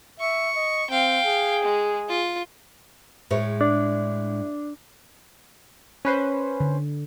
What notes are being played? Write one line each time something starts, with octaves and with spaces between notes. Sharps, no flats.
E5 C#6
D#5
C4 F5 G5
G#4
G#3
F4
A2 G#3 C#5
D4
C#4 B4 C5
D3